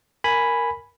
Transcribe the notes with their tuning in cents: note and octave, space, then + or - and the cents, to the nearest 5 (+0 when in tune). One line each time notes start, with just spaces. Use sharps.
A#4 +0 G#5 +0 B5 +0